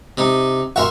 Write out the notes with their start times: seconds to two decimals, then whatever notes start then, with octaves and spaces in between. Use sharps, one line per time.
0.17 C3 D#4
0.76 A#4 E5 F#5 C6 C#6